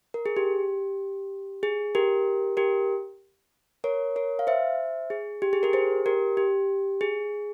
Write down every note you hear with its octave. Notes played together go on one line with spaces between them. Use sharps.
A#4
G#4
G4
G#4
G4 A#4
G4 A#4
A#4 C#5
A#4 C#5
F5
C5 E5
G#4
G4
G#4
G4 A#4
G#4 C5
G4 A#4
G4
G#4